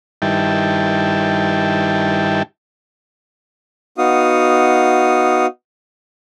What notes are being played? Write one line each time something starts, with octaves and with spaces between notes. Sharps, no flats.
G2 D#3 E4 G5 A5
B3 D#4 F#4 F5 D#6